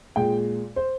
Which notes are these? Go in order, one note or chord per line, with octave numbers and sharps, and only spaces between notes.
A#2 G#3 G5
C5